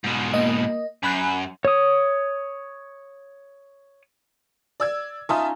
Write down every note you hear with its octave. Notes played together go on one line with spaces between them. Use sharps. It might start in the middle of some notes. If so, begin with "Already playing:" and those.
G#2 B2
A#3 D#5
F#2 G#5 B5 F#6
C#5 D#6
D5 E6 G#6
C#4 D#4 F4 E5 A5 D#6